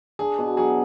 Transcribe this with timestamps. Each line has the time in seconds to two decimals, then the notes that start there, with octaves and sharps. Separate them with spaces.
0.19 D4 G#4
0.38 B2
0.57 F#3 G#4